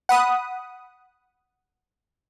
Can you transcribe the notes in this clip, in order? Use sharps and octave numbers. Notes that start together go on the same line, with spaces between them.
F#5 B5 D#6